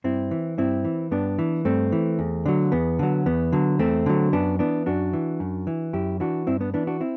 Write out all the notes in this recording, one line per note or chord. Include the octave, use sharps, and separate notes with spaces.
G2 C4 E4
E3
G2 C4 E4
E3
G2 B3 D4
E3
G2 A3 C4
E3
E2
D3 F#3
E2 B3
D3 F#3
E2 B3
D3 F#3
E2 A3 C4
D3 F#3
F#2 B3 D4
E3 B3 D4
F#2 D4 F#4
E3
F#2
E3
F#2 E4 G4
E3 D4 F#4
G2 C4 E4
B3 D4
E3 B3 D4
D4 F#4
C4 E4